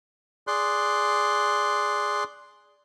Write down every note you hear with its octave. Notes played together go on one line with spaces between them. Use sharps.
G#4 D5 C6 F#6